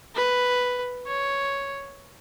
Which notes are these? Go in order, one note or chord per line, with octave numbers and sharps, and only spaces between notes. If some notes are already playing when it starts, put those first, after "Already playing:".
B4
C#5